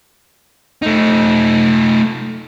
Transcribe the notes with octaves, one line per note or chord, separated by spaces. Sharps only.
A3 D#4